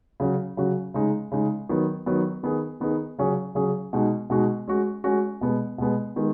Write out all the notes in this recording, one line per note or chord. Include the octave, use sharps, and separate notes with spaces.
C#3 F#3 C#4 F#4
C#3 F#3 C#4 F#4
C#3 G#3 D#4
C#3 G#3 D#4
D#3 F#3 B3
D#3 F#3 B3
D#3 B3 D#4 G#4
D#3 B3 D#4 G#4
C#3 F#3 C#4 G#4
C#3 F#3 C#4 G#4
B2 G#3 D#4 F#4
B2 G#3 D#4 F#4
G#3 C#4 F#4
G#3 C#4 F#4
B2 G#3 B3
B2 G#3 B3
D#3 G#3 B3